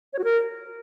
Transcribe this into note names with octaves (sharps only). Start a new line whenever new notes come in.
C#5
F#4
A#4